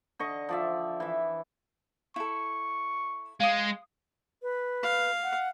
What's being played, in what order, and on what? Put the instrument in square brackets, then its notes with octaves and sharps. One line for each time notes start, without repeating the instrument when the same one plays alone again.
[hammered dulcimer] D3 D#5 C#6
F3 D5 E5
E3 E5
[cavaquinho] E4 A4 [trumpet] C#6
[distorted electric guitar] G#3 [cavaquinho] F5 D#6
[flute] B4
[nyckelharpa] F5
[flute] F#5